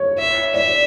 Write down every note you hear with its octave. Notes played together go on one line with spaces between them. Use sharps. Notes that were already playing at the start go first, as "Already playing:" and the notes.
Already playing: C#5
E5
D5 E5